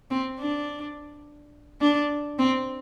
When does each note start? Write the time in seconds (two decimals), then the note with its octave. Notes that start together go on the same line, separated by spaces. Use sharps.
0.11 C4
0.39 D4
1.81 D4
2.39 C4